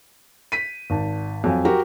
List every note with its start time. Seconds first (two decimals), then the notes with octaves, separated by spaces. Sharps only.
0.52 B6 D#7
0.90 G#1 A5
1.44 F2 F#3 F5 G#5
1.65 F#4 G4 A#4